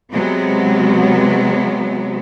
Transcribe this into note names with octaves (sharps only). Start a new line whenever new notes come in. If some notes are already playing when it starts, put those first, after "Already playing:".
C3 F#3 G#3 B3 C4